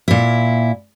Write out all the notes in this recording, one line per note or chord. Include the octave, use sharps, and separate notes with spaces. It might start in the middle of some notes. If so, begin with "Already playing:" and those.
A#2 E4